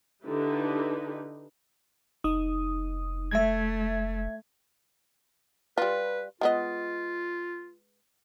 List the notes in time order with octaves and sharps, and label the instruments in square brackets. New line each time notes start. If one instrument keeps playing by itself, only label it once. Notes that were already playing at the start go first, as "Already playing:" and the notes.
[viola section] D3 D#4 E4 G4 B4
[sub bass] F1 [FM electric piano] D#4 D#6
[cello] A3 [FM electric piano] E5 G#6
[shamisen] G3 F4 [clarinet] B4
[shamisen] G#3 B3 D#5 [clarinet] F4